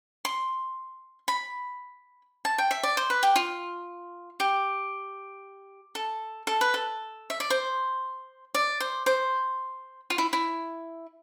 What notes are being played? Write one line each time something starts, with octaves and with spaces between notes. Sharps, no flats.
C6
B5
A5
G5
E5
D5
C5
B4
G4
F4
G4
A4
A4
B4
A4
E5
D5
C5
D5
C5
C5
F4
E4
E4